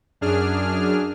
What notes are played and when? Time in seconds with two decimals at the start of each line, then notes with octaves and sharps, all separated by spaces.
0.21 F#2 D4 G#4 F6